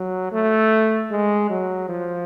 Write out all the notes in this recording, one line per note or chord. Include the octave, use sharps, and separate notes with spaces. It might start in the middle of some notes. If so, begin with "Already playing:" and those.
Already playing: F#3
A3
G#3
F#3
F3